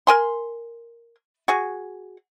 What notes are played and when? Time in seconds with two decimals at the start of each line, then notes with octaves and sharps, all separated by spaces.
0.07 A#4 G#5 C6
1.48 F#4 G#4